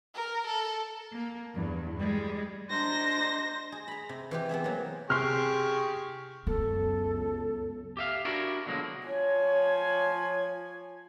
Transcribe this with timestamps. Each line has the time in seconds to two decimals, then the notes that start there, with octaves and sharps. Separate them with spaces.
0.15 A#4
0.47 A4
1.12 A#3
1.55 E2 G2
1.97 G3 G#3
2.70 D4 C5 D#5 A#5 A#6
3.72 G#4
3.88 A#5 B5
4.09 C3
4.31 E3 F4 G4
4.49 B3 C4 G#4 E5
4.64 F#3 A#3
5.10 C3 G4 G#4 C6 C#6 F6
6.47 C#2 F#2 B3 A4
7.97 G4 E5 F5
8.25 D4 E4 F#4 A#4 D5
8.66 B2 D3 F3 F#3 G#3 A#3
9.07 F3 C#5 G#5